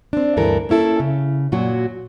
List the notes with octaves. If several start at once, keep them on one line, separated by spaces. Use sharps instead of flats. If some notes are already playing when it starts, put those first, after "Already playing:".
C4 D4
D2 G2 E3 A4 A#4
A#3 C#4 E4 A4
C#3
F#2 A#2 F#3 F#4